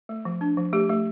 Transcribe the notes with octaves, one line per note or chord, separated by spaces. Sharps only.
A3
F3
D4
F3
A3 G4
A3